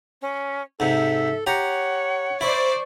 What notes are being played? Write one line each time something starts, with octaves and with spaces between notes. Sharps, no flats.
C#4
G#2 C3 A4 E5
G4 C#5 F#5 A#5
E4 C5 D5 B5 C#6